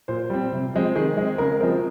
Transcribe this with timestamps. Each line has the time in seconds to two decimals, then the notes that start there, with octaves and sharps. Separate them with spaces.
0.08 A#2 C5
0.30 G3 C4
0.53 C3
0.74 F3 G#3 C4
0.95 D#3 G#4
1.17 G#3 C4
1.38 C#3 A#4
1.60 F3 G#3 C4 A#4